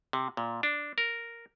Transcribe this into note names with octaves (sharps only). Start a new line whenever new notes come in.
C3
A#2
D4
A#4